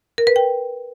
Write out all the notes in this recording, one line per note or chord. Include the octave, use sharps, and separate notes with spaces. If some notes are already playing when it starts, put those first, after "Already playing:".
A#4
B4
G5